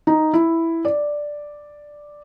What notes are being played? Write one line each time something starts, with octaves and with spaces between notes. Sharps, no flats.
D#4
E4
D5